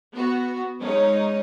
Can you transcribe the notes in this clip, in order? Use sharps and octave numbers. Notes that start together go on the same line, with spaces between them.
B3 F#4
G#3 C#4 D#4 C#5